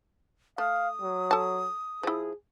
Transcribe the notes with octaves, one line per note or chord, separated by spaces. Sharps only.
A3 F5 D#6
F#3
A4 A5
F3 E4 G#4